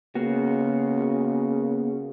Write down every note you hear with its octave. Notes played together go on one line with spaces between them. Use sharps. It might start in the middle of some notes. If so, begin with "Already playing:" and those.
C#3 A#3 B3 F#4